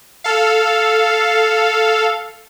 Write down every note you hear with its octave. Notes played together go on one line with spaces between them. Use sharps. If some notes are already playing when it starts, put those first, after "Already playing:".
A4 F5